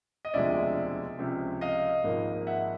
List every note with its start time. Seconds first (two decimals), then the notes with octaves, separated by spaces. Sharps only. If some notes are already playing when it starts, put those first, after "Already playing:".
0.25 D#5
0.34 E1 D2 C3 F3 G#3 D5 E5
1.19 C#2 C3 F3
1.61 D#5 F5
2.04 G#1 G#2 F3 A#3
2.47 E5 F#5